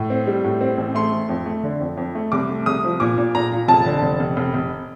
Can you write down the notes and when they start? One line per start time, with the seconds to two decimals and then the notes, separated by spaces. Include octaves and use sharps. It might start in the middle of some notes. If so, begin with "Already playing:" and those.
Already playing: A2
0.10 C4
0.27 G3
0.44 A2
0.61 C4
0.77 A1
0.95 A3 C6
1.12 A3
1.29 F2
1.46 A3
1.63 D3
1.80 F2
1.97 F2
2.15 A3
2.32 C2 D6
2.49 A3
2.66 C2 D#6
2.84 F3
3.00 A#2 D6
3.18 A#2
3.35 A#2 A#5
3.52 A#2
3.68 F1 A5
3.86 D3
4.03 F1
4.20 F1
4.37 F1
4.54 F1